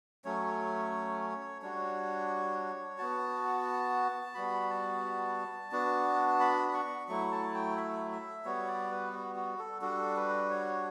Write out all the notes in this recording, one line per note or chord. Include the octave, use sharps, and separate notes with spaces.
F#3 A3 C#4 C#5
G3 D4 F#4 C#5
B3 F#4 A5
G3 B3 F#4 B5
A5
B3 D4 F#4
B5
B5
C#6
F#3 A3 E4 C#6
A5
G5
E5
E5
G3 B3 F#4 C#5
D5
B4
F#4
F#4
A4
G3 D4 F#4 A4
B4
C#5